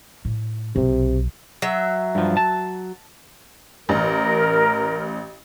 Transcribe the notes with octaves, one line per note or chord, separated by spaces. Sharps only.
A2
B1 C3
F#3 E5
G2 F3
A5
A1 A#4